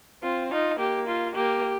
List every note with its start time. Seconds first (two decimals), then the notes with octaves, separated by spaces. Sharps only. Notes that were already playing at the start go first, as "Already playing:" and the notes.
0.23 C4 F4
0.51 D#4 F4
0.79 A#3 G4
1.07 F4
1.35 A#3 G4